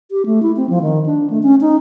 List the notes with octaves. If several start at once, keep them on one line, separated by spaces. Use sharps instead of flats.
G4
A3
E4
C4
F3
D#3
D4
A3
C#4
D#4